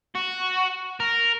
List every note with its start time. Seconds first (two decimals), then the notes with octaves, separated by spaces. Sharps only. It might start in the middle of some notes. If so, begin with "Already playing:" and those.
0.15 F#4
1.00 A#4